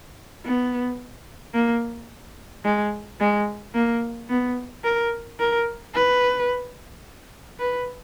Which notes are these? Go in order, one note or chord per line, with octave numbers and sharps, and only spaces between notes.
B3
A#3
G#3
G#3
A#3
B3
A#4
A#4
B4
B4